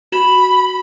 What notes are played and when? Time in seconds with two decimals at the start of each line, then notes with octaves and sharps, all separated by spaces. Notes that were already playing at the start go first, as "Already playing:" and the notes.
0.12 F#4 B5 E7 F#7